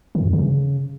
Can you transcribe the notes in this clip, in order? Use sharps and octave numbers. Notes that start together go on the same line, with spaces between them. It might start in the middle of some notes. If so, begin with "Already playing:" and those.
D#3
F#2
F2
D3
C#3